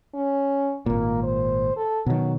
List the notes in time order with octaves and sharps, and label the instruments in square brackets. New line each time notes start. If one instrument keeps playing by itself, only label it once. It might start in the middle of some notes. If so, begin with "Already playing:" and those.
[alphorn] C#4
[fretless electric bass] G#1 A#2 [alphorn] A#3
[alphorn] C5
A4
[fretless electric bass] B2 D#3 [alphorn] F#3